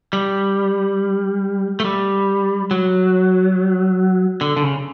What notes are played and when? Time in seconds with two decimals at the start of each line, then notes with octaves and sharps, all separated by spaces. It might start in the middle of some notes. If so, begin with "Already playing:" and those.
0.13 G3
1.80 A3
1.85 G3
2.71 F#3
4.41 D3
4.56 D3
4.63 C#3